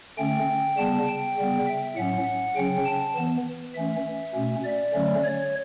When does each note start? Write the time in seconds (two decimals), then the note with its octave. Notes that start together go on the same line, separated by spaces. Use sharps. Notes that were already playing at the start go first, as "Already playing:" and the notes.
0.18 D3 A3 C#4 G5
0.77 C#3 G3 B3 A5
1.08 G5
1.37 C#3 G3 B3
1.67 E5
1.96 A2 F#3 C#4 F#5
2.56 C#3 F#3 C#4 G5
2.85 A5
3.16 E3 B3
3.74 E3 A3 C#4 E5
4.34 B2 A3 C#4
4.64 D5
4.94 D3 F#3 A3 C#4
5.24 C#5